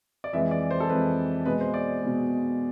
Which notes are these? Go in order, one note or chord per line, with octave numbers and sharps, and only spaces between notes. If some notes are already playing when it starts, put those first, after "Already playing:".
D5
F2 E3 G#3 E5
D5
C5
A4
F2 E3 G#3 B4
B2 G#3 B4
C5
D5
B2 G#3